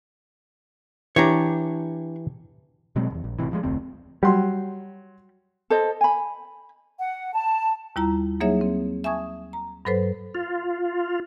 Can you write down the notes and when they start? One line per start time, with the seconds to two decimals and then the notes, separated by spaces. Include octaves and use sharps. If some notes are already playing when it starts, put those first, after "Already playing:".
1.16 E3 D4 G4 C#5 A#5
2.96 B2 F#3 G#3 C4
3.10 D1 E2
3.24 A#1
3.39 A1 C3 E3
3.51 G2 F3 G#3
3.63 F1 D2 C4
4.23 F#3 G3 C6
5.70 A4 C5 D#5
6.01 G#5 B5
6.98 F#5
7.33 A5
7.96 D#2 G3 E4 F4 A#5
8.40 F#3 A#3 D#4 G#4 C#5 E5
8.61 C4
9.04 E5 G#5 A5 C#6 D#6 G#6
9.53 A#5
9.85 G2 F#3 A4 B4 C5
10.35 F4